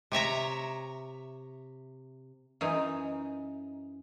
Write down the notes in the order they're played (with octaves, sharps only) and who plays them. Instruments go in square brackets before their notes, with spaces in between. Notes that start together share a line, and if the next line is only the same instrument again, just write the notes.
[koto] C3 C#5 E5 A#5
[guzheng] F#2 E3 D#4